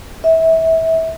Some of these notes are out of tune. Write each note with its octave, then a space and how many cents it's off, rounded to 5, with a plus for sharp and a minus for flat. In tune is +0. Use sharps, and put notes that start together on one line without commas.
E5 -25